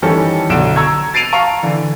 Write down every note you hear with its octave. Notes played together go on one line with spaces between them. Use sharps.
D#3 E3 G3 C#4 A4
B1 D3 D7 E7
A#5 C#6 E6 G#6
A6 C7 D7 D#7 F7
F5 A5 A#5 C#6
D3 E3